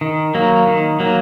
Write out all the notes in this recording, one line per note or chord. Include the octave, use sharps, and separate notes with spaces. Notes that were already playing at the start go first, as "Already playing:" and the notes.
D#3
F#3 A#3
D#3
F#3 A#3